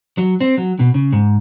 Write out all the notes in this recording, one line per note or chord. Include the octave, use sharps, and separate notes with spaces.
F#3
C4
F#3
B2
C#3
G#2